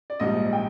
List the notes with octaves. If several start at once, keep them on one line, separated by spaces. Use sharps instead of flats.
D5
A#1 G#2 G3 D#5
G5